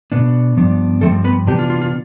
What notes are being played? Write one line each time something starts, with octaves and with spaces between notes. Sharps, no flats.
B2 B3 D4
G2 F3 B3 D4
G2 F3 A3 C4 A4
B3 B4
C3 E3 G3 B3 D4 G4
F4
F4
F4